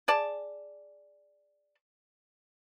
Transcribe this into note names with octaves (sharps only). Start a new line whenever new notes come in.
G#4 D5 A5